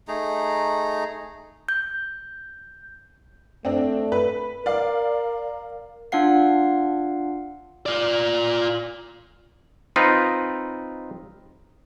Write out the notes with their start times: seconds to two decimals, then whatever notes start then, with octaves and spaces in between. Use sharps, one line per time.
0.08 A3 D#4 G#4 A#5
1.69 G6
3.65 A3 C4 D4
4.12 B4
4.66 A#4 D5 F5
6.12 D4 F4 F5 F#5 C7
7.86 F4 D5
9.96 C4 D#4 F4 B4